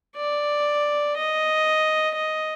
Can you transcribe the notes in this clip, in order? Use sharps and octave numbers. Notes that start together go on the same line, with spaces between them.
D5
D#5
D#5